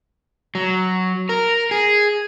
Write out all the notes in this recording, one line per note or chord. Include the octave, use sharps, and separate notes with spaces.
F#3
A#4
G#4